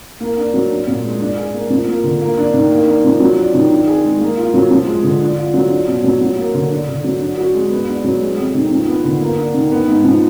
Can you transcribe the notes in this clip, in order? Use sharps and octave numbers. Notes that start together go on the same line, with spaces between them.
A#3
D4
F#3
D4
A#2
G#3
D4
G#4
A#3
F3
A#3
D3
A#3
D4
D#3
A#3
D4
F3
F#3
D4
D#3
D4
G#4
G#3
A#3
F4
F#3
F3
G#3
D3
D4
F4
F#3
D4
B2
F#3
F#3
A#3
D3
D4
D3
F#3
D4
F#4
G#3
B3
D4
F#3
G#3
F2
D#3
F3
B3
D3
A#3
D4
D#3
B3
G#2
F3